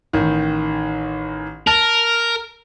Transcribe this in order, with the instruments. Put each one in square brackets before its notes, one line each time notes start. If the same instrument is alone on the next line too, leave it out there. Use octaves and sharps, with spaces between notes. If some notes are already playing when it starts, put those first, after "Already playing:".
[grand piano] A1 D#3
[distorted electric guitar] A#4 [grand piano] A5